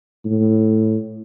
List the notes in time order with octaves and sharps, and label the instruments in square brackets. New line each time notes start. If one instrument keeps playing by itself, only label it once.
[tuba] A2